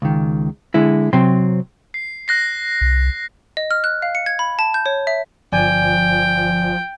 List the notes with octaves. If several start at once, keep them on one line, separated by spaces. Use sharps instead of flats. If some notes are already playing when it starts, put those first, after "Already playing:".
C#2 D#3
D3 G#3 E4
C3 F#3 C4 C6
C7
F#6 A#6 C7
C2
D#5
F6
F#6
F5
C#7
G#6
B5
A5
G6
C#5
E5
G1 F3 D5 G5 G#5